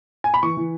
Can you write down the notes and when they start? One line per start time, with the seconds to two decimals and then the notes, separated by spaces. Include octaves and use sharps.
0.24 G#5
0.34 B5
0.43 E3 C#6
0.57 E3